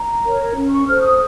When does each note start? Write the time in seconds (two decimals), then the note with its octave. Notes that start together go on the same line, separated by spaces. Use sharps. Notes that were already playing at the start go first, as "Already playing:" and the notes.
Already playing: A#5
0.24 A#4 C#5
0.56 C#4
0.70 C#6
0.87 A4 C5 F6
1.01 D#6